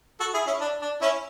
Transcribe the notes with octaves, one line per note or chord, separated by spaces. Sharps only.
F#4 A4
E4 G#4
C#4 E4
D4
D4
C#4 E4